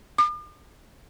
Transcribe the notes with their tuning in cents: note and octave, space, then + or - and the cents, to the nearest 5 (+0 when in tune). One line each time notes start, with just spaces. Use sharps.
D6 +45